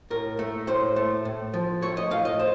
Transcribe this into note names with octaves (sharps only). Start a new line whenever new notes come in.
A2 A#4
A3
A2 C5
A3
A2
F3
A3 C#5
D#5
A2 F5
D#5
C5